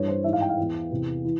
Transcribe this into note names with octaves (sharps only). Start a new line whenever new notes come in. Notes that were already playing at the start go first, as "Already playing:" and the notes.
Already playing: G2 E3 C#5
C5
G#2 E3 E5
F5
G5
F5
E2 E3
E2 C3 E3
E3